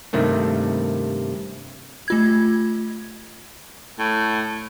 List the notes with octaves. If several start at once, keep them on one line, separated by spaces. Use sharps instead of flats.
G2 C3 D#3 A3 A#3
A3 F4 G#6
A2